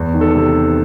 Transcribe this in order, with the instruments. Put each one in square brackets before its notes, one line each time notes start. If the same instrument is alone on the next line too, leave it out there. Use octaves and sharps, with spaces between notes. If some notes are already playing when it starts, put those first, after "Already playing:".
Already playing: [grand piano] E2
D#3
A4
C3